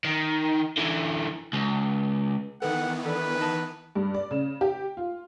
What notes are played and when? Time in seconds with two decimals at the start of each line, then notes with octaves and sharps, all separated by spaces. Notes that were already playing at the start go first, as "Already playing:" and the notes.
0.05 D#3
0.77 D3 E3
1.53 C#2
2.62 D#3 E3 B3 A4 B4 F#5 G5
3.05 D4 A4 B4 D5
3.39 D#4 D#5 A5
3.95 G2
4.14 D5
4.31 C#3
4.61 G4
4.97 F4